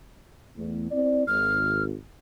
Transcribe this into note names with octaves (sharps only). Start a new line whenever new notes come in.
E2 A3
C4 E4 D5
G#1 F6